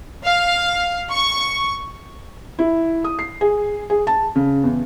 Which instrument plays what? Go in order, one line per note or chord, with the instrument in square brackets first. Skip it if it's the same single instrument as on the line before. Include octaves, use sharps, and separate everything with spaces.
[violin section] F5
C#6
[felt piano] E4
D#6
C7
G#4
G#4
A5
C#3
E2